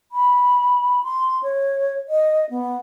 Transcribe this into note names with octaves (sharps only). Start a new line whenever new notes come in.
B5
C6
C#5
D#5
B3